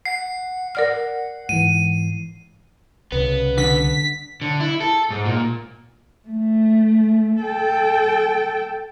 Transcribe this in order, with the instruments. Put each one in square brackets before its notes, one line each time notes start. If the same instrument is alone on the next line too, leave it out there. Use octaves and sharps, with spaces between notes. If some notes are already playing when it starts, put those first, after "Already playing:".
[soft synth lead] F#5 [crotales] C7
[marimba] A#4 D5 F6 [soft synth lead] F#5
[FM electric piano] G#2 E3 [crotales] D#7
[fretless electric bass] C2 C#3 [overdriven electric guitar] B3
[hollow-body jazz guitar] D3 [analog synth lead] B6
[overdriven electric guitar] D3
E4
A4
G#2
A#2
[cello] A3
A4 G5